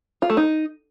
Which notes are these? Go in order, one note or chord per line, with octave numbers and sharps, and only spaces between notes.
F4
A3
D#4